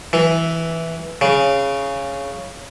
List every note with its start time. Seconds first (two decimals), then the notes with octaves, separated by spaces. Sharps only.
0.13 E3
1.21 C#3